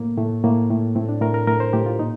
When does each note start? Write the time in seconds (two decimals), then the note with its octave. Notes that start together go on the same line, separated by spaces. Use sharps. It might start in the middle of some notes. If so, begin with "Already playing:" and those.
Already playing: A2 A#3
0.18 A2 A3
0.44 A2 A#3
0.70 A2
0.95 A2 C4
1.09 D4
1.21 A2 A#4
1.34 A#4
1.47 A2 A#4
1.60 C5
1.73 A2 G4
1.86 F4
1.99 A#2 D#4